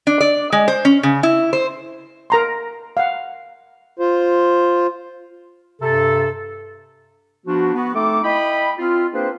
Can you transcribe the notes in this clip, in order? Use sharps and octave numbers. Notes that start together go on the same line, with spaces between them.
D4
D5
G#3
C5
C#4
C#3
E4
C5
A#4 A#5 C6
F5 F#5
F4 C5
G2 C3 A4
F3 B3 D4 F#4
B3 F#4
A3 C4 D#4 A4 D6
E4 D#5 G5 B5
C4 F4
A#3 C4 D4 G#4 B4 C5